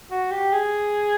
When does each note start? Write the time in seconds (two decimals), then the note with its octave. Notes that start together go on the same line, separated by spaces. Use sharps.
0.11 F#4
0.31 G4
0.52 G#4